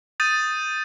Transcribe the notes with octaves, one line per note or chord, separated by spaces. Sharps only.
D#6 G6 A6 D#7